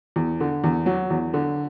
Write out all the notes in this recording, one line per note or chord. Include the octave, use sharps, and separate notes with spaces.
E2
D3
E2
F#3
E2
D3